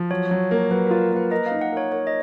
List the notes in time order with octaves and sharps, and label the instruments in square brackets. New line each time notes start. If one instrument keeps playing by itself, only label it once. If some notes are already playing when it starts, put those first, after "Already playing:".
Already playing: [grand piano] F3
[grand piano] F#3 [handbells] C#5
[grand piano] F#3
A#3
[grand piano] F#3 [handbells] B4
[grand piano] F4 [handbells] A#4
[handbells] A#4
[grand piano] A#3 [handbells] B4
[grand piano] A#4 [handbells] D#5
[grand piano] D#4 [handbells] F5
[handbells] F#5
[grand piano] A#4 [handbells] C#5
[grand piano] A#4 [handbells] C#5
[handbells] D#5